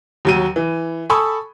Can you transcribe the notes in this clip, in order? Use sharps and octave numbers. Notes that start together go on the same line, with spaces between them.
D#2 F#3 D#7
E3
A4 G#5 B5 C#6 D#6 E6